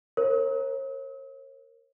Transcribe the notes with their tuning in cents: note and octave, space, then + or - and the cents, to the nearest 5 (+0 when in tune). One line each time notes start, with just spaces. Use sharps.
A#4 +0 C#5 -45